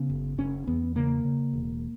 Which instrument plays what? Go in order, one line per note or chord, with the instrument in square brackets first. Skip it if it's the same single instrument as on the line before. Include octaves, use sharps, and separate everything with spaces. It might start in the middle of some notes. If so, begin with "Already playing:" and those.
Already playing: [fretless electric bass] C#3 B3
F#1
F#1 C#4
E2 B3
C#3 A#3
C#3
E1